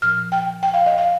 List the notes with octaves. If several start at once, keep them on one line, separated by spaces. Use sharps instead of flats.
A#2 F3 F6
G5
G5
F5
D#5
F5